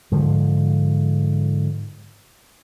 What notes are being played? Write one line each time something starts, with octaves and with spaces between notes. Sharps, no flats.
G#2 D3 F3